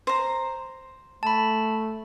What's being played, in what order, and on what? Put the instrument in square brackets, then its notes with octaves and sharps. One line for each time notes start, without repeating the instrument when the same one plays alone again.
[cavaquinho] C5 A#5
[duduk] A3 [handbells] A5 B5